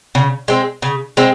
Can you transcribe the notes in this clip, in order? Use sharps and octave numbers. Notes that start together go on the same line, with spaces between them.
C#3
G#3 C4
C#3
G#3 C4